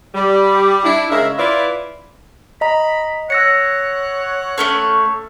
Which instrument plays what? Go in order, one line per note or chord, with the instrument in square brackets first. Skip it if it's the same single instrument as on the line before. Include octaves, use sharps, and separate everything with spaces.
[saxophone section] G3
D4 E4
C#3 G#3 A#4 E5
E4 F4 B4 D5 E5
[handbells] D#5 A#5 [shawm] B5
[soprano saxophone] C#5 [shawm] F#5 [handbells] E6 A#6 C#7
[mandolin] A3 C#4 C#5 [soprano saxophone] A4